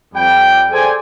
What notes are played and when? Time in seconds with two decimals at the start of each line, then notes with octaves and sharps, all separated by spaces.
0.14 F2 G3 G5
0.71 G#4 A4 C5 D5 G5 G#5